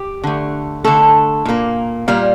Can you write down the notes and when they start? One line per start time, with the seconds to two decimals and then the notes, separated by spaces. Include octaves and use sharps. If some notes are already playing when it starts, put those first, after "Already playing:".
Already playing: G4
0.24 D3 A3
0.84 D3 A3 A4
1.45 A#2 G3 A#3
2.08 A#2 G3 A#3 F5